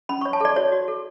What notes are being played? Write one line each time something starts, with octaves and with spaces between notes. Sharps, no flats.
C#4 B5
C#5 C#6
A5
A4 D5
F#4 C#5
F#4
A4